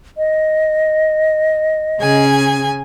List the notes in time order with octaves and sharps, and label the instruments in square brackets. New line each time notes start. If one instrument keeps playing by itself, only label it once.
[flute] D#5
[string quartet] C#3 G#4 G#5